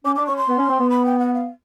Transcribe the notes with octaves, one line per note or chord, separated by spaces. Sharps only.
C#4 D6
D4 D6
C#4 C#6
C6
B3
C#4
C4
B3
B5
G5
F#5
F5